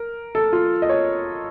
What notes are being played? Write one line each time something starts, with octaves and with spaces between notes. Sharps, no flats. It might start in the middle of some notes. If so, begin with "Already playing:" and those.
Already playing: A#4
A4
F4
D#5
C#5